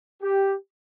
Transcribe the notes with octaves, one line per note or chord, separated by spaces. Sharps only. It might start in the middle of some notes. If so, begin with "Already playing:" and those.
G4